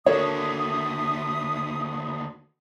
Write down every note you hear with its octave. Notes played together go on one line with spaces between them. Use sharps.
D#2 D3 F#4 A4 A#4 C#5 E5 D#6